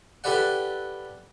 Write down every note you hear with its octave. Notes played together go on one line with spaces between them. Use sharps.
E4 G4 A4 B4 D5 F#5